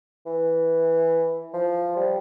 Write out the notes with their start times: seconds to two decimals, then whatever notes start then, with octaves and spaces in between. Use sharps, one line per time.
0.26 E3
1.53 F3
1.96 G3